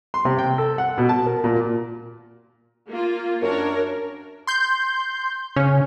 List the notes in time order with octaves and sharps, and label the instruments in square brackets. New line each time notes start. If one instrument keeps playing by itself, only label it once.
[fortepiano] C6
C3
G5
A4
F#5
B2
A5
A#4
A#2
[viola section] A#3 F4
[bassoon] F#2 [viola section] D4 A#4 C#5
[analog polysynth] C6 G6
[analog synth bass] C#3 [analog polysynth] C#4